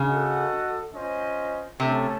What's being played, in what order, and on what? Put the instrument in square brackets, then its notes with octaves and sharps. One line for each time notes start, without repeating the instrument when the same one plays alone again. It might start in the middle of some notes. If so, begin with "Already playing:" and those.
Already playing: [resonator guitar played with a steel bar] C#3
[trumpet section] F#4 A4 D#5 F#5
C#4 F4 C5 D#5
[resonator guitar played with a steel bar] C3 [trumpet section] A3 C#4 A4